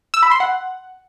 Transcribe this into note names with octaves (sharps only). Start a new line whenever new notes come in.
E6
B5
C6
F#5